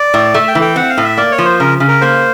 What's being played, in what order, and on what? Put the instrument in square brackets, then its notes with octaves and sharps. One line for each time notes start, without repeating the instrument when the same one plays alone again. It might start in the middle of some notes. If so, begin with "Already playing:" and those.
Already playing: [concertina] D5
[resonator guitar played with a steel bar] A2
[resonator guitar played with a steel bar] A3 [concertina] E5
[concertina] G5
[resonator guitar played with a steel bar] E3
[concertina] G5
[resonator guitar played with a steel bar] C4 [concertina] F#5
[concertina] F5
[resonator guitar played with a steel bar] A2
[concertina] E5
[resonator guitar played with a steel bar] A#3 [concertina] D5
[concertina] C#5
[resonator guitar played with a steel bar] F3
[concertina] C5
[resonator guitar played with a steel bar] C#3 [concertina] A#4
[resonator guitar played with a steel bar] C#3
[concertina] A#4
[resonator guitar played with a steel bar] A#3 [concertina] C5